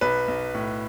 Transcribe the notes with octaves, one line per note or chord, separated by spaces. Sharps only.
B1 B4
B1
A2